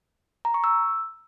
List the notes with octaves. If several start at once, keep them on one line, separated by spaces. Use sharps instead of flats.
A#5
C#6
E6